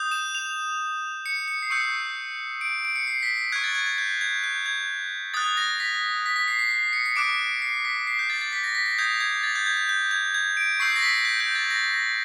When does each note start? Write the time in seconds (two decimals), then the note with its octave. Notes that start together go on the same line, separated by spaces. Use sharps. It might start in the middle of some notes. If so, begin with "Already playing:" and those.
Already playing: D#6 G6
0.11 E7
0.35 F7
1.26 C#7
1.48 C#7
1.63 C7
1.70 C#6 E6 G6 C#7
2.61 D7
2.85 D7
2.96 C#7
3.07 C7
3.23 B6
3.52 F#6 G#6
3.56 C#6
3.64 A6
3.75 G#6
3.86 G#6
3.98 G6
4.21 G#6
4.44 G6
4.66 G#6
5.34 D#6 F#6 A6
5.57 A#6
5.80 B6
6.26 B6
6.36 B6
6.48 C7
6.59 C7
6.71 C7
6.93 C#7
7.06 C#7
7.16 D6 F#6 D7
7.39 D7
7.62 C7
7.85 B6
8.07 C7
8.19 G6
8.30 A6
8.41 A6
8.53 B6
8.64 A#6
8.75 B6
8.86 B6
8.98 D#6 G6 G#6
9.20 G#6
9.43 A6
9.55 G6
9.66 G#6
9.77 G6
9.89 G6
10.11 G#6
10.34 G#6
10.57 D7
10.80 C#6 E6 G6 C7
10.96 A#6
11.02 B6
11.25 G6
11.40 G6
11.55 A6
11.70 A#6
11.94 A#6